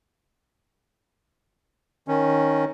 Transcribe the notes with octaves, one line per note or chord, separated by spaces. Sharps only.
D#3 C#4